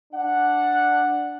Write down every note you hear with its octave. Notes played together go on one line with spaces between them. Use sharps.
D4 F#5